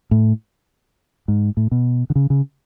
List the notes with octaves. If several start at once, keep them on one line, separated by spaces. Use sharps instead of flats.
A2
G#2
A2
B2
D3
C#3
C#3